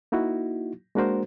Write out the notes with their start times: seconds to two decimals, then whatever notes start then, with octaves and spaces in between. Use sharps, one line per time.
0.12 A#3 D#4 E4 F#4
0.95 G#3 A#3 D4 F#4 A#4 C5